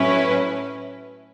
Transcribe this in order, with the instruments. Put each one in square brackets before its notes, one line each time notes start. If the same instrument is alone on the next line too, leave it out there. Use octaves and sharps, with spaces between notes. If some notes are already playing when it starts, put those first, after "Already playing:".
Already playing: [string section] A2 F#3 C#4 E4 B4